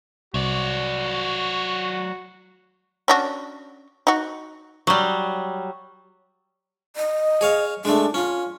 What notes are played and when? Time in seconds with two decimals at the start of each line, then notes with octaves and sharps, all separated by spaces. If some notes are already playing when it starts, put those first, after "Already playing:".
0.34 C2 F#3 F#4 D5
3.08 C#4 D4 F#4
4.07 D#4 F#4
4.87 F#3 G3
6.96 D#5
7.41 G#4 C#5 F5
7.85 G#3 A3 D4
8.14 C#4 F4